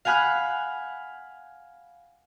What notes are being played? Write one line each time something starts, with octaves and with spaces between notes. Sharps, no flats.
F5 F#5 G#5 B5 F6 F#6